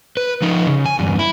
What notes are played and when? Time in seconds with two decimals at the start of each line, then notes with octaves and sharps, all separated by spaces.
0.17 B4
0.42 F3 D#4
0.67 C#3
0.86 G#5
0.99 E2 G2
1.19 E4